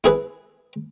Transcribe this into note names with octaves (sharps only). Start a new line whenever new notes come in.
E4 G#4 B4